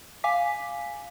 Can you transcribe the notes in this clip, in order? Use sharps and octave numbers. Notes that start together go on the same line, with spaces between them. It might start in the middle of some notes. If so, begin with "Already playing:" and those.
F5 G#5 D6 B6